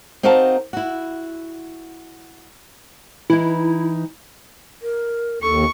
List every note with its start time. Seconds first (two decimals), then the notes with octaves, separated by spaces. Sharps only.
0.23 C4 D#4 F#4 A#4 F5 A5
0.73 E4 F#4
3.30 E3 D#4 E4
4.82 A#4
5.42 D#2 A4 C#6